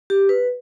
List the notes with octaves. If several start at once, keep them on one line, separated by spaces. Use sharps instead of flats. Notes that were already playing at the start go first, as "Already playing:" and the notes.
G4
B4